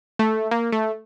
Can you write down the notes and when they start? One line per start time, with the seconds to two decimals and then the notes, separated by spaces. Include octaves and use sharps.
0.19 A3
0.51 A#3
0.72 A3